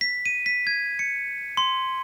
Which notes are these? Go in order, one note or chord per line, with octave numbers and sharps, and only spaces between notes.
B6
D#7
B6
G#6
C#7
C6